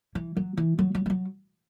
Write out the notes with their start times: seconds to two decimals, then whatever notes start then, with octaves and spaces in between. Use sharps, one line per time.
0.15 E3
0.37 F#3
0.57 E3
0.79 F#3
0.95 F#3
1.06 G3
1.10 F#3